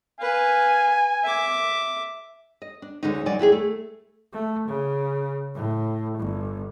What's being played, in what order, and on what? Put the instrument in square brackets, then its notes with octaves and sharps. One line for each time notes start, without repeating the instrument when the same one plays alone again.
[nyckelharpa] B4 F5 [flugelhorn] G#5
[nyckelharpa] E5 D6
[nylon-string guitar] D#5
D4
D2 D3 G#3 C#4 D#4
A#2 F#3 D#4 D5 G#5
D#2 E4 G4 G#4
A3
[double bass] A3
C#3
A2
G1